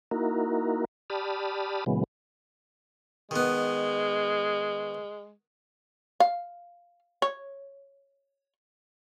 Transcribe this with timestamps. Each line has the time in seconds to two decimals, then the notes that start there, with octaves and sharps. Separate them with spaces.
0.11 A#3 D#4 E4 F#4 A#4
1.10 G4 D5 A5 B5 D#6 F6
1.86 A#2 C#3 E3 F#3 G#3 B3
3.31 D#3 G#3 B3
6.20 F5
7.22 C#5